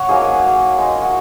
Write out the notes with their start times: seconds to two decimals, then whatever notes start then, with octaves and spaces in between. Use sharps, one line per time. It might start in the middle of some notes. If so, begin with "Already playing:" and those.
Already playing: C#5 F#5
0.09 F#3 A#3 D#4 G#4
0.78 G#3 D#4
1.02 F#4